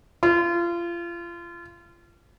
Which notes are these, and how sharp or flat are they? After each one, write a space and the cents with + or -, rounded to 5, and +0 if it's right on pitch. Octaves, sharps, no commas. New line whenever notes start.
F4 -30